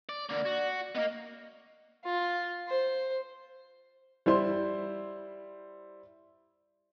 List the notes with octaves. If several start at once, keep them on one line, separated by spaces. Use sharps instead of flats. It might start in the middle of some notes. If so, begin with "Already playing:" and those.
D5
D3 A#3 D5
F#4
A#3 B3 D#5
F4
C5
G3 E4 C5 C6